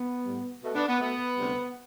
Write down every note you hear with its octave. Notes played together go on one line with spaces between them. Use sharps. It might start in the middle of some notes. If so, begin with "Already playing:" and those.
Already playing: B3
A2 G3
B2 A3
B3 D4
B3
B2 A3 B3
D2 C3 G3